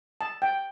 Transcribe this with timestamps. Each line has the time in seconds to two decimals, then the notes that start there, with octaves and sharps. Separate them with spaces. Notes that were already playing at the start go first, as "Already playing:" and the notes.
0.21 A5
0.42 G5